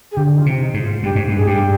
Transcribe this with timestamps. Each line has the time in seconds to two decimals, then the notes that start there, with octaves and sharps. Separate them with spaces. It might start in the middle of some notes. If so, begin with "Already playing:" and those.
0.11 G#4
0.16 D3 G4
0.33 D#4
0.38 F4
0.46 C3
0.60 D#4
0.74 G#2
0.82 F4
1.03 G2 G4
1.15 G#2
1.28 G2
1.36 G#4
1.46 G2 G4